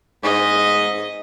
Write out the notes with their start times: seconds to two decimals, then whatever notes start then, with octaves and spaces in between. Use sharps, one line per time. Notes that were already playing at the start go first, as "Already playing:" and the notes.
0.23 G#2 D#5